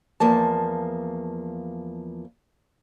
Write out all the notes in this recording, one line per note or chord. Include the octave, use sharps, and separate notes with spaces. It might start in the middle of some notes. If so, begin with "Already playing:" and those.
E2 F3 A#3 A5